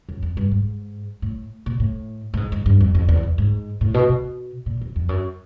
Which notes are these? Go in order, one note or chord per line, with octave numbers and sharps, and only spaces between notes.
F#2
F2
G2
G#2
A2
A#2
A2
A2
G#2
G#2
G2
F2
F2
E2
E2
G#2
A2
B2
B2
A#2
F2
F2
F#2